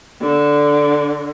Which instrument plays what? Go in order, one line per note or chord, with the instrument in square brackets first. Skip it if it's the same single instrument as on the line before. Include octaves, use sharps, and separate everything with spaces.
[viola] D3